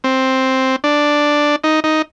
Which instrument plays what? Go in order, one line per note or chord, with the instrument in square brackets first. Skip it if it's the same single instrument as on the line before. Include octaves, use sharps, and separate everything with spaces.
[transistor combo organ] C4
D4
D#4
D#4